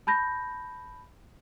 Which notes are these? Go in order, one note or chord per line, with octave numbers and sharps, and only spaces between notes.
A5 B5 G6 A#6